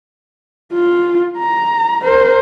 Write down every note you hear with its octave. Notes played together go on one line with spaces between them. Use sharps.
F4
A#5
A#4 C5